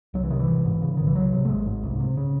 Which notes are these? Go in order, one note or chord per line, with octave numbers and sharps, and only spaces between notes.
C2 F#3
E3
C3 D#3
E3
G#1
G#2
C#3
G#1 D#3
E3
C2 F#3
C3
A3
G#1 G#3
G#2
C2
C3
C#3